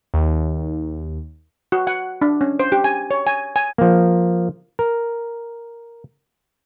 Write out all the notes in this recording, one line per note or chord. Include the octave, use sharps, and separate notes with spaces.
D#2
F#4
F#5
D4
C#4
C5
G4
G#5
C#5
G#5
G#5
F3 A#3
A#4